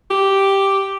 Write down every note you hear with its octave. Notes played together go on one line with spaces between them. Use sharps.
G4